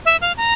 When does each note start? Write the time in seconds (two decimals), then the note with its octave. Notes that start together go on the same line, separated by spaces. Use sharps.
0.05 E5
0.21 F5
0.37 A#5